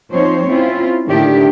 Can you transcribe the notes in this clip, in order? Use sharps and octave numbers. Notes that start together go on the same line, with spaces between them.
F3 C4 D#4 C5 C#5
C4 C#4 E4 F4
A2 D3 D#3 D4 E4 G4